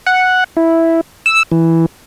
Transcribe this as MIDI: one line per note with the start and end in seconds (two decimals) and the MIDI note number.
0.07 0.44 78
0.57 1.01 64
1.26 1.43 88
1.52 1.86 52